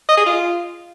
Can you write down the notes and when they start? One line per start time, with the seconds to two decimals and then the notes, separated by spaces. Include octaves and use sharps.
0.08 D#5
0.17 G#4
0.26 F4